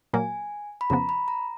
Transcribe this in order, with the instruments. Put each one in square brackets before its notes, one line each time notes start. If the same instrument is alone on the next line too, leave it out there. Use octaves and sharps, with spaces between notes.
[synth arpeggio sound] A#2 F#3 A#3 [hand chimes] G#5
[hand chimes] B5
[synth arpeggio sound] F2 C#3 F3 B3 [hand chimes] A#5
[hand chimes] B5
A#5